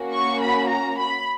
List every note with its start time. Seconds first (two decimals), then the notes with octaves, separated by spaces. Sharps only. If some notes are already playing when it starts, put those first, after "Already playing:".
Already playing: A#3 C#4 F#4
0.12 C#6
0.41 B5
0.69 A#5
0.98 B5